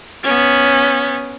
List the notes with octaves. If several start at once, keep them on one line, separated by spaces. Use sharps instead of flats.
B3 C#4